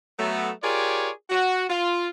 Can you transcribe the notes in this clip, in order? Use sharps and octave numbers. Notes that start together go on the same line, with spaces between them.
F#3 A3 B3
F4 G4 G#4 A#4 C#5 D5
F#4
F4